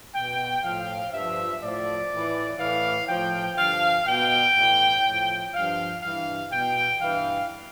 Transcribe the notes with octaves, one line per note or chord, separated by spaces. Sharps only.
B2 G5
A2 F3 F5
G2 F3 E5
A2 F3 D5
A2 E3
A2 E3 F5
A2 F3 G5
G2 D3 F3 F5
B2 G5
A2 E3
A2 F3
G2 F3 F5
G2 E3 F5
B2 G5
G2 E3 F5